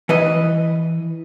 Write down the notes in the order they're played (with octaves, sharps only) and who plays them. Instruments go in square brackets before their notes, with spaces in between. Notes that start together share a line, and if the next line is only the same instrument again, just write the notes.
[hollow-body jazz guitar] E3 B4 D#5